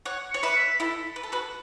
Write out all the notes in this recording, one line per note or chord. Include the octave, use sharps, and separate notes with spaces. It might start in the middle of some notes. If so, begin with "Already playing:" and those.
C#5 F#5
C#5 C#7
B4 E5
B6
E4 A4
B4
A4
F#4 B4